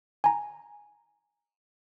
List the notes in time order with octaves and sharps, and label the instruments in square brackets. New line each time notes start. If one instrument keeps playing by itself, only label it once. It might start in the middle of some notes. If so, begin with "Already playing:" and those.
[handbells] G#5 A#5